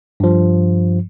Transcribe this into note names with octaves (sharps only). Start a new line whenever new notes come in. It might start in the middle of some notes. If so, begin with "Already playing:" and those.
G2 F3